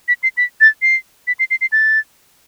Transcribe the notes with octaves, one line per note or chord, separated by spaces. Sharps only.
B6
C7
B6
A6
C7
B6
C7
C7
C7
A6